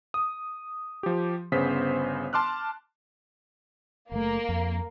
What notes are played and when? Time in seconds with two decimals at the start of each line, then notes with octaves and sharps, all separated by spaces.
0.14 D#6
1.03 F3 G4
1.52 G1 C#3 B3 C5 B6
2.33 A5 C6 D6 F6 F#6
4.12 F#1 A3 A#3
4.49 F2